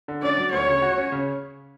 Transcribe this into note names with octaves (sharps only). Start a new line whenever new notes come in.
D3
C#4 D5
F#3
D2 C#5
C#3
F#4
C#4
C#3